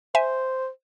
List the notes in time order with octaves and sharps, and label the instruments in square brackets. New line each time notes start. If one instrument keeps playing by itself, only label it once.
[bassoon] C5 [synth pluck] E5 G#5